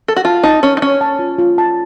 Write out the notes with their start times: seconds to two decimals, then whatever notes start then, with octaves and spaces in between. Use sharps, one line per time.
0.08 A4
0.16 F#4
0.25 F4 A5
0.43 D#4 A5
0.63 C#4 A#4
0.77 D#4
0.82 C#4 C#5
1.01 A5
1.19 F4
1.39 F4
1.58 A5